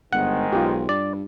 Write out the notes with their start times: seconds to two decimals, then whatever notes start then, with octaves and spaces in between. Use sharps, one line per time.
0.13 G1 G#2 D#3 G#3 F#5
0.53 B1 F4 G4
0.89 G2 D5